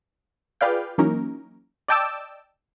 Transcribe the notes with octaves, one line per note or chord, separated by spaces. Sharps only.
F4 G#4 B4 D5 F5 G5
E3 F#3 A#3 C#4 D#4 A#4
D5 D#5 G5 A5 D6 E6